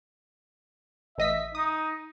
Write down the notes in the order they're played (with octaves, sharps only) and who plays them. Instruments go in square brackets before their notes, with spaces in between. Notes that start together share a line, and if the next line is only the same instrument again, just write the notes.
[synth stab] A1 D#5 B6 [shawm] E5
[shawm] D#4 [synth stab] D#6